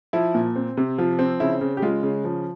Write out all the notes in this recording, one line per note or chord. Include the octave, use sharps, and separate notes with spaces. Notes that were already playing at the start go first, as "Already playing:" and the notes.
F3 E4
A#2
C4
C3
F3 F4
C4
C#3 E4
C#3
G4
G#3 F4
C#3
F3